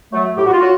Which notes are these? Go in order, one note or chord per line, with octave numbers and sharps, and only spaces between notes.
F#3 A3
A2 G4
F#4
F4
F#3 F#4